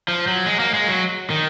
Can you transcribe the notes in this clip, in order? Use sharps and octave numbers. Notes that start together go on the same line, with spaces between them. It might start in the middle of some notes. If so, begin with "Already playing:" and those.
F3
F#3
G#3
A#3
G#3
F#3
D#3